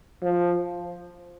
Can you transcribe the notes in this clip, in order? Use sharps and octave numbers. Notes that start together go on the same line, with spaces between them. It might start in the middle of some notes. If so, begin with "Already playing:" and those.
F3